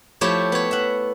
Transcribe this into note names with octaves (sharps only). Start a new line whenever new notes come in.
F3 A3 E4 G4 C#5
B3 C#5
E5 F#5